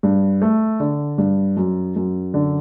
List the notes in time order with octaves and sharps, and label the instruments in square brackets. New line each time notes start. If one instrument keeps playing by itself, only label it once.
[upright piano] G2
A3
D3
G2
F#2
F#2
D3